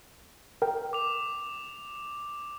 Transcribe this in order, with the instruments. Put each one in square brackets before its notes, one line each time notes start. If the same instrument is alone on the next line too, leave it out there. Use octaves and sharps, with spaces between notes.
[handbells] A#4 G5
[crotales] D6 F7